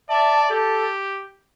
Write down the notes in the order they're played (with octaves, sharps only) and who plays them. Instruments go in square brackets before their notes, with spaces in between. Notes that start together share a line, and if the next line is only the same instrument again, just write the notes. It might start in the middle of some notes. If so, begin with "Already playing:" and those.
[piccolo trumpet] D5 [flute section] E5 A5
[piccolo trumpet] G4 [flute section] A4